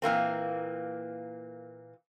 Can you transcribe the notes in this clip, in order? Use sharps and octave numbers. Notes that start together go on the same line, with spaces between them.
A#2 E3 A#3 C4